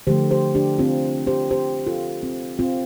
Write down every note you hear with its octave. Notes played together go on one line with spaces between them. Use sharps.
D3 F3 A3 G4 C5
G4 C5
D4 G4
C4 F4
G4 C5
G4 C5
F4 A4
C4
C4 F4